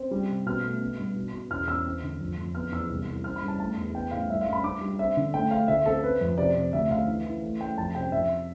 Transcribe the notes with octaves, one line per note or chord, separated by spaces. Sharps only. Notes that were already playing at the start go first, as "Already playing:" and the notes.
Already playing: C4
G3
C3
B2 F6
A3
B3
G2
B2
B2
E2 F6
E2 E6
C4
D3
F2
F2
B3 F6
E2 E6
C2
C2
C4 F6
B5
G2
A5
A3 A5
E2
B3 G5
A2 F5
G2 E5
F5
G2
B5
D4 D6
G3
C4 E5
D3
A3 G5
A3 F5
D2 E5
C4 A4
C4 B4
F2
C3 D5
C3
D2 E5
D2 F5
E3
E3
A3
A3 G5
F2 A5
C3 G5
F2 E5